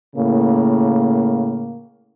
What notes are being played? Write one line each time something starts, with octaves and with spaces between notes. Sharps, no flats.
A2 C#3 A#3